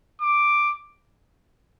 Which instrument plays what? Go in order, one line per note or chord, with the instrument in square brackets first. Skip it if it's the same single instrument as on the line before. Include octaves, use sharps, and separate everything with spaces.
[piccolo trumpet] D6